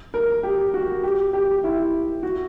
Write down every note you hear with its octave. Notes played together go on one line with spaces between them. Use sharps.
A#4
G4
F#4
G4
G4
E4
F#4